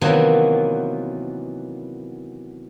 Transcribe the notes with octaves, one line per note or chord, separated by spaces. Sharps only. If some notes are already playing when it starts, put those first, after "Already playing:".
C3 D#3 E3 F#3 A#3 B3